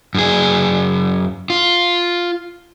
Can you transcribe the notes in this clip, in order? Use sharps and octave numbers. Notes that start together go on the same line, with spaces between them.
F#2 G#4
F4